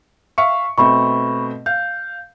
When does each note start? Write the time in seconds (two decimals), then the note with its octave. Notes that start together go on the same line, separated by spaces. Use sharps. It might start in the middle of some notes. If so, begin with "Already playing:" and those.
0.38 E5 F5 C#6 C#7
0.78 B2 A3 C4 B5 C#6
1.66 F5 G6